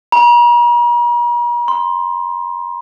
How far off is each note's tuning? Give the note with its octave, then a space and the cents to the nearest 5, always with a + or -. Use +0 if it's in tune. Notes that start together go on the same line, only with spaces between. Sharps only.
A#5 +45
C6 +0